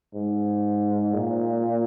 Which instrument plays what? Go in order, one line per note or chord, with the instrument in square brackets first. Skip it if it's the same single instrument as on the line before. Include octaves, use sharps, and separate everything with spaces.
[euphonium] G#2
A#2